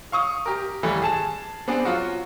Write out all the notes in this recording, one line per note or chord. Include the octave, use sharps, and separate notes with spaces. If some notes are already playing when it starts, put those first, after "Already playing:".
F5 C#6 D#6
G4 A#4
D#2 E3 G3 A3
G#4 A5 E7
B3 C4 D4 G#4
F#3 F4 F#4